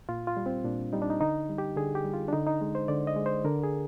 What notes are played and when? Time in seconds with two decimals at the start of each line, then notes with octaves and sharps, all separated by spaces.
0.09 A#2 F4
0.27 F4
0.37 G3
0.46 C4
0.64 A#2 D4
0.93 G3 D#4
1.02 D4
1.10 D#4
1.20 D3 D#4
1.49 G3
1.58 G4
1.76 D3 G#4
1.95 G4
2.04 G3
2.13 F4
2.28 D4
2.33 D3 D#4
2.47 D#4
2.61 G#3
2.75 C5
2.88 D3 D5
3.07 D#5
3.16 G#3
3.26 C5
3.44 D3 A#4
3.64 G#4